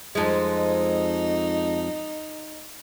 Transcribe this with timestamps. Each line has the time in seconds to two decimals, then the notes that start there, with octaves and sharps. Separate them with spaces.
0.15 F2 G#3 D#4